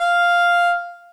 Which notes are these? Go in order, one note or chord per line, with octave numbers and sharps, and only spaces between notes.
F5